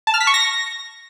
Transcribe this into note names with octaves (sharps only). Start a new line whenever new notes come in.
A5
F6
B6
C#6
A#6